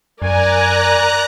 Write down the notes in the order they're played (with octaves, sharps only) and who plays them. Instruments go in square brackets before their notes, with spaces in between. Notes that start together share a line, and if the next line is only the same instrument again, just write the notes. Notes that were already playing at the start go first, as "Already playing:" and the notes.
[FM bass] F#2 [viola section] A#4 G#5 [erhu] D5 [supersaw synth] A#5 F#6